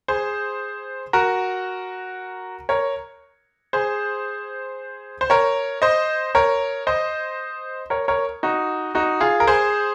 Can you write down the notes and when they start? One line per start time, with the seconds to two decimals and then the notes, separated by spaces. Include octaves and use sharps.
0.08 G#4 C5
1.13 F#4 A#4
2.69 A#4 C#5
3.73 G#4 C5
5.21 C5
5.30 A#4 C#5
5.82 C5 D#5
6.35 A#4 C#5
6.87 C5 D#5
7.90 A#4 C#5
8.08 A#4 C#5
8.43 D#4 F#4
8.95 D#4 F#4
9.21 F4 G#4
9.40 A#4
9.47 G#4 C5